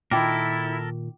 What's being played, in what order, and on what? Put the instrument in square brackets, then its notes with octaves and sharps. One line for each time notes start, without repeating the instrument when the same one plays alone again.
[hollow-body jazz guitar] A#2 D#3 [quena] E4 [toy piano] F4 G5 D6 [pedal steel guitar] A4 A#4